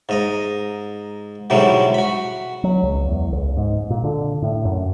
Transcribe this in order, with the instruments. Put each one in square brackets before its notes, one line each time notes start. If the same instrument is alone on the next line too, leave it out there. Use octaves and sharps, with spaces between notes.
[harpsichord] G#2 D#5 A#5
G#2 B2 D3 E3 F#3 G3
F#4 B5
[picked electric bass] F#3
C#2
E2
C#2
G#2
A#2
D3
A2
F#2